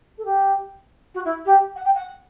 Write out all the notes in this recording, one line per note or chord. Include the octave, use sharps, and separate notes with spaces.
A4
G4
F#4
E4
G4
F#5
G5
F#5